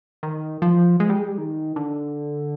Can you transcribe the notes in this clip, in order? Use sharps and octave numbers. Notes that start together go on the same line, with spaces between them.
D#3
F3
G#3
G3
G#3
G3
D#3
D3